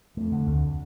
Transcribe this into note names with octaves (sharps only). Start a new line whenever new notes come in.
F2 A3
D3
D2